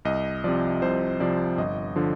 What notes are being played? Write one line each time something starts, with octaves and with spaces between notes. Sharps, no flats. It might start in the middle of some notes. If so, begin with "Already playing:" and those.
C2 D#5
C3 F3 D5
C2 C5
C3 F3 D5
G1 D#5
D3 F3